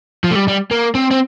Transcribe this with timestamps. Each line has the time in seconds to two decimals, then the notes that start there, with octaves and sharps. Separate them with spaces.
0.24 F3
0.31 A3
0.36 G3
0.48 G3
0.71 A#3
0.95 C4
1.11 C4